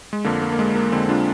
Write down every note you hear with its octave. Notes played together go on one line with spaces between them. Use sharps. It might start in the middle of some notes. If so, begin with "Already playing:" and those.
G#3
F2 D3 A#3
A#3
A#3
G#3
A#3
F2 D3 G#3 C4
D4 F4